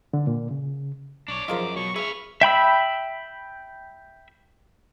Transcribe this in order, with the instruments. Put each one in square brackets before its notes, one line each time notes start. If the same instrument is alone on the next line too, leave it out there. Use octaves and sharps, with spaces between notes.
[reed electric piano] D3
A#2
C#3
[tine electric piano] B1 C#6 [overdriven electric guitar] D4 C#5 [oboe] D6
[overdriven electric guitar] F#2 [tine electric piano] F3 G#4 D#5 [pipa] F4 A#4 C5
[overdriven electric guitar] B2 [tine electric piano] F#3 [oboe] C#6
[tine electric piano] G#4 [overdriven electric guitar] B4 F5 [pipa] E5 [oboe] C#6
[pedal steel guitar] E5 G5 B5 E6